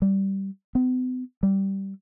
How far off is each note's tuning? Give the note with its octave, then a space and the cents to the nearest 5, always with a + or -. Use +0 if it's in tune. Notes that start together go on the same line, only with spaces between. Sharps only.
G3 -10
B3 +45
G3 -10